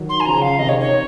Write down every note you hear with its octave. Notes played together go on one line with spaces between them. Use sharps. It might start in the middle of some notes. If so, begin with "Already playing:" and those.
Already playing: D#3 F#3
C6
G#5
C#3 F3 A#5
F5
C3 D#3 D#5
C#5
C#5